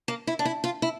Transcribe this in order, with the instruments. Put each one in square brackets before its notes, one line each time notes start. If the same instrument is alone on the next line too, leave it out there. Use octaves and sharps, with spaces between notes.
[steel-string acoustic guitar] A#3
E4
D4
E4
F4
E4